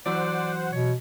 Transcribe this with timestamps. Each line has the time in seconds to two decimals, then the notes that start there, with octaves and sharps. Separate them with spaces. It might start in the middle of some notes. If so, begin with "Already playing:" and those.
0.06 E3 F#3 C5 D5 F#5
0.73 B2 C#5